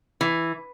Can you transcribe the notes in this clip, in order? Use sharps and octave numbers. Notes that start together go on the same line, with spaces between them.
E3